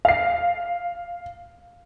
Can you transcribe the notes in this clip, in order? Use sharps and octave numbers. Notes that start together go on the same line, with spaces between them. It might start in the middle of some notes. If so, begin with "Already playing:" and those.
F5 C7